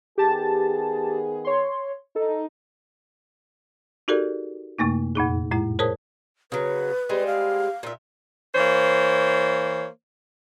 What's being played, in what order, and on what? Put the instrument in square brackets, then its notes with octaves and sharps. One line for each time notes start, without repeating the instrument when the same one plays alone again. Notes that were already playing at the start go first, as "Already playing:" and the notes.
[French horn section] D#3 B3 G#4 [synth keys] G4 A5 A6
[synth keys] C#5 C6
[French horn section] D#4 [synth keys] A4
[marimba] D#4 F#4 G4 A4 A#4 D5
F#2 C3 A3 A#3 D#4
F2 A#2 D#4 G#4
A2 G#3 E4
G#4 A#4 C5 C#5 A5 D#6
[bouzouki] C#3 F#3 [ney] B4
[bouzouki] G3 G#3 C4
[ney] F5
[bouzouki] A#2 E5
[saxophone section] E3 A#3 C5 C#5